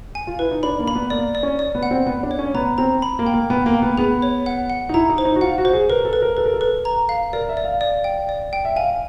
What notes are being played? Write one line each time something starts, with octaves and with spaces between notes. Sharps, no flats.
G#5
F4
E4 B4
D#4
D4 B5
A#3
B5
B3
A#3 D5
D5
C#4
D5
B3
F#5
C4
B3 F#5
D4
C#5
C#4
B3 A#5
C4 A#5
B5
A#3
G5
A#3
B3 G5
A#3
G5
B3
B3 G#4
C#5
F#5
F#5
D#4
E4 A#5
D#4
C5
D#4
F#4
F4 F#5
F#4
C5
G#4
A#4 B4
A4
B4
A#4
A4 B4
A#4
A4
B4
A#5
F5
A#4 D5
E5
D5
F5
D5
G5
D5
G5
E5
F5 G#5